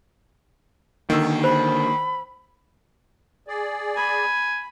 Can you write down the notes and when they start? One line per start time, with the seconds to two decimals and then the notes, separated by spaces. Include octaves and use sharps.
1.10 D3 D#3 A#3 E6
1.44 C5 B5
3.48 G#4 D5
3.96 G#5 B5